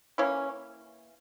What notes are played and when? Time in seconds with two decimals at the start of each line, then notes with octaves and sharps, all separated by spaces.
0.18 E3 A#3 C#4 E4 C#5